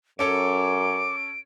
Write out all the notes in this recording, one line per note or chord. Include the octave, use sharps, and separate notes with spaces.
F#2 C#4 A4 C#5 D6 D7